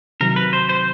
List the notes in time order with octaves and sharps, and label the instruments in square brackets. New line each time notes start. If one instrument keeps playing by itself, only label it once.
[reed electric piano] C3 D#3 F#3 [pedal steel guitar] A#4
[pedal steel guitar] B4
C5
C5